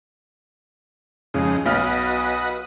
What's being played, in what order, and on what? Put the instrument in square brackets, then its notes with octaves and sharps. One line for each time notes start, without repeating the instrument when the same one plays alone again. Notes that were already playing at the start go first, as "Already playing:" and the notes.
[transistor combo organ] F2 G#3 D#4 [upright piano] C#3
[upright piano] B1 F6 [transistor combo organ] F#4 B4 D#5